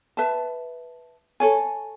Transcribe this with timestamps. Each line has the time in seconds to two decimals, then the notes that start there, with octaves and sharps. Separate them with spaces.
0.17 B4 E5 A5
1.40 A4 C#5 G#5